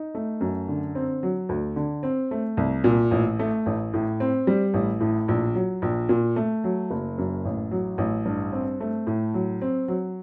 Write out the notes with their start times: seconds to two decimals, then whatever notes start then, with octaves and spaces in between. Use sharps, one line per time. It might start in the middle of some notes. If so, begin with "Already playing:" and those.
Already playing: D#4
0.15 A3
0.41 F#2
0.68 D3
0.95 C4
1.23 F#3
1.49 D2
1.76 D3
2.03 C4
2.31 A3
2.57 C2
2.84 A#2
3.11 A1
3.39 A3
3.66 A1
3.93 A2
4.20 C4
4.47 G3
4.74 A1
5.01 A2
5.28 A#1
5.55 F#3
5.82 A#1
6.09 A#2
6.36 A3
6.64 F#3
6.90 F#1
7.18 F#2
7.45 A1
7.71 F#3
7.98 A1
8.25 G2
8.52 C4
8.80 A3
9.07 A2
9.34 F#3
9.62 C4
9.88 F#3